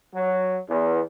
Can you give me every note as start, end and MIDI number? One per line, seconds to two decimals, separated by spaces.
0.14 0.57 54
0.70 1.00 40